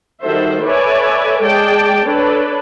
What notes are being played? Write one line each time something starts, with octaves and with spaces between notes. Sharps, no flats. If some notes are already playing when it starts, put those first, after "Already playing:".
D#3 G3 F#4 A4 C5 E5
A4 B4 C#5 D5 E5 G#5
G#3 G#4 D5 G5 A5
D4 A4 B4 C#5